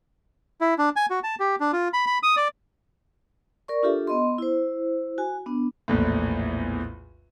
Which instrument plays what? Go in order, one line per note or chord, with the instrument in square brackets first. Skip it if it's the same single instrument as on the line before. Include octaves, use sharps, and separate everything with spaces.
[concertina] E4
D4
G#5
F#4
A5
G4
D4
F4
B5
B5
D#6
D5
[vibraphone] A#4 D5 C#6
D4 F4 G4 A4 E5
B3 D#5 C6
E4 C5
F#4 G#5
B3 D4
[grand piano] A#1 E2 A2